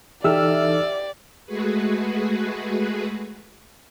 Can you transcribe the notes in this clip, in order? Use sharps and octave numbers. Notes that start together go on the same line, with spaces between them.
E3 D#4 G4 A4 D5 E5 E6 F6
G#3 A3 F#4 G#4 B4